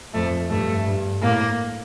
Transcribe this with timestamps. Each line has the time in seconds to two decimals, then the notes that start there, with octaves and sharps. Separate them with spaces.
0.14 F2 A3
0.50 G2 A3
0.86 G2
1.22 A2 A#3